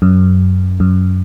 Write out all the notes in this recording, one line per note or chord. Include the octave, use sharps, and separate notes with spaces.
F#2
F#2